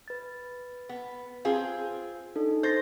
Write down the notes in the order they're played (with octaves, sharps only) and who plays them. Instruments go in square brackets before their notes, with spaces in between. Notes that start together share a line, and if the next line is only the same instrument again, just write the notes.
[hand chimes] B4 A6
[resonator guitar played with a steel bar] B3
C4 F4 G#4
[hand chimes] D4 D#4 A4
[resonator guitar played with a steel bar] C5 [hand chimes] G6 A6 A#6